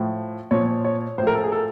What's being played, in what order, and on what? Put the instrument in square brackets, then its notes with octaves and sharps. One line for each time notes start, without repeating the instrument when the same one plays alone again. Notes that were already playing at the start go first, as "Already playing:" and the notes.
Already playing: [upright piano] A2 F3
A#2 F3 C#5
C#5
A2 C5
F3 A#4
A4
G#4
A4